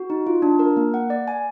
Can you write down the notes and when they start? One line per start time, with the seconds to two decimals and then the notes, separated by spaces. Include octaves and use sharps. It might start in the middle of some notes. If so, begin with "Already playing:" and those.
Already playing: F#4
0.10 D#4
0.27 F4
0.42 D4
0.59 A#4
0.77 A#3
0.94 F#5
1.10 D5
1.28 G#5